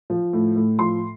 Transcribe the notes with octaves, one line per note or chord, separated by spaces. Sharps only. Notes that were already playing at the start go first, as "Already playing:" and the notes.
F3
A2
A2
F3 C6